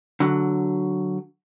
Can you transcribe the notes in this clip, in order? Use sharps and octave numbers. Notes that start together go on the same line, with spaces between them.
D3 F#3